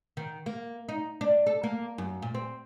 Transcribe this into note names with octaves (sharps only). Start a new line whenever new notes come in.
D#3
A#3
D#4
D4
A4
A#3
F#2
A#2
C4